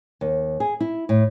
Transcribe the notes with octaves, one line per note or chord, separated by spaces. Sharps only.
D#2
G#4
E4
A2